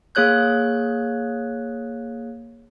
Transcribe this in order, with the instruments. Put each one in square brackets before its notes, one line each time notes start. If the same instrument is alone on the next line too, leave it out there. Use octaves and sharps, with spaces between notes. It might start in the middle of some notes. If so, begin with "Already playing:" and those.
[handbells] A#3 G#4 C#5 F#6 G6